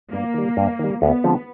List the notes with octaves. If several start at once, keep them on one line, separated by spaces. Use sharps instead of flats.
G2 A#3
D#3 G3
G2
D#3 G3
D2 B3
D3 F3 G#3 C4